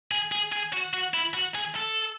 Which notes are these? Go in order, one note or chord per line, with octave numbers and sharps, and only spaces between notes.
G#4
G#4
G#4
F#4
F#4
E4
F#4
G#4
A4